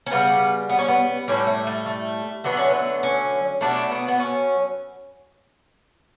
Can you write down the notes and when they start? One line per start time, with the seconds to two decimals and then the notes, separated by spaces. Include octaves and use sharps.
0.06 C#4
0.11 C#3 G3 B3
0.69 B3
0.79 C#4
0.88 B3
1.28 A2 G3 C#4
1.47 A3
1.67 A3
1.86 A3
2.44 D3 F#3 A3 B3
2.57 C#4
2.70 B3
3.03 C#4
3.61 B2 F#3 A3 D4
3.91 B3
4.08 B3
4.20 C#4